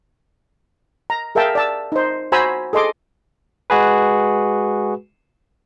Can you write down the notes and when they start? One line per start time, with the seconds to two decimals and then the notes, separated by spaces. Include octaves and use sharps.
1.10 A#5
1.35 G#4 A#4 E5 F5 G5 A5
1.55 D5 A5 E6
1.92 D#4 C5
2.32 F#4 C5 G#5 A#5 B5 E6
2.73 G#4 A4 D#5 C6 D6
3.70 G#3 F#4 G#4 B4